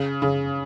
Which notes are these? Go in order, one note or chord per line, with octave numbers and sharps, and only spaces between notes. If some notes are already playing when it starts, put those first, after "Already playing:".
Already playing: C#3
C#3